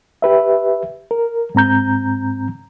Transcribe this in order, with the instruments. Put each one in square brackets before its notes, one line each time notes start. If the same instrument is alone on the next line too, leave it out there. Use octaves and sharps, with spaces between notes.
[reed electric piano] G4 B4 E5
A#4
G#2 C4 A#5 G6